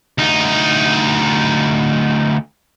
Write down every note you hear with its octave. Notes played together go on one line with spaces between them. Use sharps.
D2 D#4